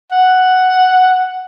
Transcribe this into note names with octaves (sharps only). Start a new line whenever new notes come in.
F#5